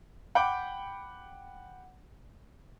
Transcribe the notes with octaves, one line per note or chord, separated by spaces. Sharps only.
F#5 G5 B5 D6 G6 D7